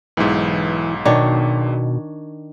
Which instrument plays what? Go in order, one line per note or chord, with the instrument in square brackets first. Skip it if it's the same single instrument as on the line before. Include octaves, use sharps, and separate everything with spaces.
[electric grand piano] B1 G#2 [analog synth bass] E3
[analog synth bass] B2 [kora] D#3 D4 C#5